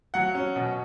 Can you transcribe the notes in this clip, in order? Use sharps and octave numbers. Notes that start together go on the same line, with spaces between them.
F#3 F#5
C#4
B2